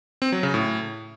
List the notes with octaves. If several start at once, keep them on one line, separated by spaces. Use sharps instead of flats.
C4
F#3
C#3
A2